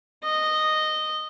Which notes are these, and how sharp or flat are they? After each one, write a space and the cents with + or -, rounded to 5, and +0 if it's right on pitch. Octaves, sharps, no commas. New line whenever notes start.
D#5 -10